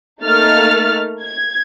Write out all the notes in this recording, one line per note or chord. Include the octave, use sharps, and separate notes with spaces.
A3 A#3 D#4 F6 A6
G#6